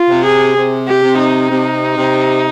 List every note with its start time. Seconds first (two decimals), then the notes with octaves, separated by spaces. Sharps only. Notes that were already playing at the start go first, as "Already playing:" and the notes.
Already playing: F4
0.09 C3
0.25 G#4
0.56 C3
0.87 G4
1.02 C3
1.19 D#4
1.50 C3
1.97 C3